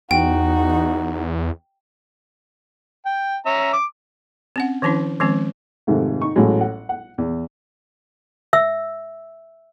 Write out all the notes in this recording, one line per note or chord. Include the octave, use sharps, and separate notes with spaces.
E2 D#4 F#4 G5
G5
C#4 E5 A#5
D6
C4 C#4 F#5
D#3 F3 C#4 D4 E4
D#3 F3 G#3 C4 C#4
F2 G#2 C3 D#3 A3
D#4 C#6
A1 A2 F#3 G#3
F#5
F#5
E2
E5 E6